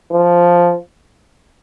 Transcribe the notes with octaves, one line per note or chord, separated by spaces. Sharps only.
F3